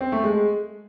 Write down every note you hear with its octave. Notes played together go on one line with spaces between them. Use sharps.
C4
A3
G#3